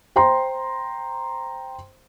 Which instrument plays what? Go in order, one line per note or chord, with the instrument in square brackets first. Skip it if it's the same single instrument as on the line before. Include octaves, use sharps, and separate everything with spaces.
[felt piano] C5 G5 A#5 C6